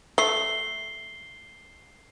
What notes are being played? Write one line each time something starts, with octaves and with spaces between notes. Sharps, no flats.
A3 C7 G7